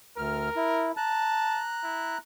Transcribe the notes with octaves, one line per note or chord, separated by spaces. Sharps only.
D2 A#4 F6
E4
A5 A#5 F#6
E4